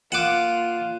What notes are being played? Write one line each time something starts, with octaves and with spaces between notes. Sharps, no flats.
A#2 F4 F#5 D6 F#6 D#7 E7